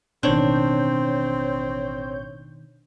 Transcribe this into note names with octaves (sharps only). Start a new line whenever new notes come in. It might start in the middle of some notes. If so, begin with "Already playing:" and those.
A1 B2 D#3 C4 D4 C#5 G6